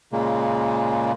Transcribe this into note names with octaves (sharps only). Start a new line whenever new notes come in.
A#2 C#3 G#3 A#3